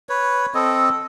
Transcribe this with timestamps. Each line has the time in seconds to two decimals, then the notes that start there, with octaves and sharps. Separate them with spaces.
0.09 B4 C#5
0.54 C4 A4 D#5